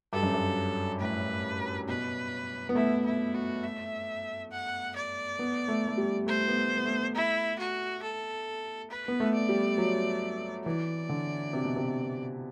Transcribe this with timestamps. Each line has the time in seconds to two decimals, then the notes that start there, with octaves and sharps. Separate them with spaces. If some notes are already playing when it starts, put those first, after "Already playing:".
0.13 G2 A4
0.23 F#2
0.34 G2
1.00 A2 B4
1.88 B2 B4
2.69 B3
2.75 A3 E4
3.05 E4
3.34 F#4
3.63 E5
4.51 F#5
4.96 D5
5.39 B3
5.68 A3
5.88 A3
5.98 G3
6.26 A3 C5
6.48 B3
6.56 A3
6.77 B3
6.85 A3
7.15 E4
7.59 F#4
8.02 A4
8.90 B4
9.08 B3
9.20 A3
9.34 D5
9.49 G3
9.78 F#3
10.65 E3 D5
11.09 D3
11.53 C3
11.65 B2
11.76 C3